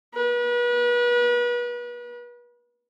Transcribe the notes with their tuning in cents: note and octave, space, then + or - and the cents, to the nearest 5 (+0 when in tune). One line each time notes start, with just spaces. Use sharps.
B4 -35